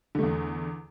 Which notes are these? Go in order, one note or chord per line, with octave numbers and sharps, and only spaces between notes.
E2 D3 A3